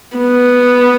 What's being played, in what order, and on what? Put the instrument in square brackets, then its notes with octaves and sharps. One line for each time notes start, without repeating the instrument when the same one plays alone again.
[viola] B3